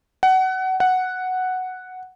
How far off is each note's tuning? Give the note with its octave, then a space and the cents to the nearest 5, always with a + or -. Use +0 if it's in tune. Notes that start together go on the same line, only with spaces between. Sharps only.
F#5 +25
F#5 +0